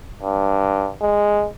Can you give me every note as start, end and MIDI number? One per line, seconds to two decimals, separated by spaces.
0.23 0.89 43
1.01 1.47 56